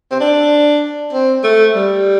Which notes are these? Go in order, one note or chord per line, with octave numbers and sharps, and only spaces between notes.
C4
D4
C4
A3
G3